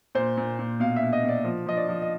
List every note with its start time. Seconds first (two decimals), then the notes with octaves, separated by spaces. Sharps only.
0.15 A#2 C5
0.37 A#2
0.59 A#2
0.80 B2 F5
0.96 E5
1.02 B2
1.13 D#5
1.24 B2 D5
1.45 F3
1.66 F3 D#5
1.77 D5
1.89 F3
2.02 D#5